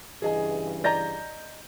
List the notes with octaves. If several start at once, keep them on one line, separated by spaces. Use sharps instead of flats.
G2 C#3 E3 G#4 D#5 G#5
D5 D#5 A#5 G6 A#6